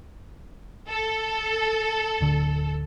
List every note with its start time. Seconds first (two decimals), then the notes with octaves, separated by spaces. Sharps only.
0.89 A4
2.21 D1 D3